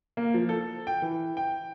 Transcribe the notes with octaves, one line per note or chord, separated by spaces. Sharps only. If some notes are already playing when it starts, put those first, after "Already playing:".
A#3
F3
A4
G5
E3
G5